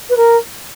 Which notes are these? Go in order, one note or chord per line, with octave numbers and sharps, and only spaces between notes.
B4
A#4